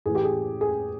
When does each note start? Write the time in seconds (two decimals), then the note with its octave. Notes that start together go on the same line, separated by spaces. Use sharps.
0.06 A2 E3 A3 G#4
0.15 G4
0.24 G#4
0.61 G#4